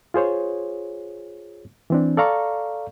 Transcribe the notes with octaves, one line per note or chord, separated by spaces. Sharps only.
F4 G#4 C5 C#5
E3 C4 D4
A4 D5 F5 A#5 C#6